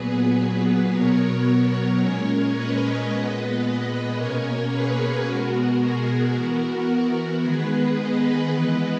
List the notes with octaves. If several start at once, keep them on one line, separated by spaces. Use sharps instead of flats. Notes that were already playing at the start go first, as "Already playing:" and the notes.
Already playing: A#2 F#3 B3 G#4 B4
G#4 B4
B2 F#3 B3 A#4 C#5
A#2 G#3 C#4 A#4 C#5
B4 D#5
A#2 G#3 B3
B2 A#3 C#4 A#4 C#5
G#4 B4
B2 G#3 B3 F#4 A#4
G#4
E3 B3 F#4 A#4
D#3 G#3 B3 G#4 B4
B4 D#5
E3 G#3 B3 B4 D#5